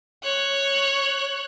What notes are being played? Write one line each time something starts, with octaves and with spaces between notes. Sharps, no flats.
C#5 F#6